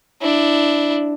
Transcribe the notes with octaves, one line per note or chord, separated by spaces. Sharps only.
D4 E4